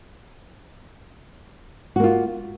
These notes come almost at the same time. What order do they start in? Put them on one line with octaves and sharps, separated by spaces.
F#4 A#3 F4